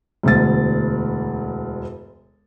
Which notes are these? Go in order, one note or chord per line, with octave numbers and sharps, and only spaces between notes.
E1 D2 A6